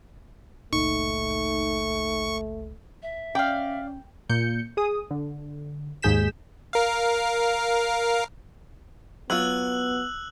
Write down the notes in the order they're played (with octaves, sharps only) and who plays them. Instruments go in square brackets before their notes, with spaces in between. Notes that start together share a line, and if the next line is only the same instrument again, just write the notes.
[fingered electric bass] G1 C#2 A#2 [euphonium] A3 [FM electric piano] D#4 [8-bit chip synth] C#6
[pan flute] E5
[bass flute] C#4 [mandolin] D5 F5 [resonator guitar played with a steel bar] G5
[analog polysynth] A#2 G6 C#7
G#4 D#6
D3
D#2 G#2 G#4 G6 B6 E7
[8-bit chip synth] A#4 F5
[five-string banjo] F#3 F4 [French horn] B3 [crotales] E6 F#6 F#7